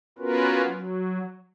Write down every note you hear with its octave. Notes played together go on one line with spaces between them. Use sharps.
B3 C#4 F4 F#4 A#4 B4
F#3